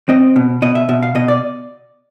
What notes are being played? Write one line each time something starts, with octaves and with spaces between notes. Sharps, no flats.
C4 D#5
B2
B2 D#5
E5
B2 E5
F5
B2 D#5
D5